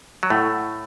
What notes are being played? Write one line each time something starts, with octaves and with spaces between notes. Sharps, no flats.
F#3
A2 A3 E4 A4 F#5